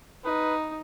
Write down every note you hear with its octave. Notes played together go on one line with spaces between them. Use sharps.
D#4 B4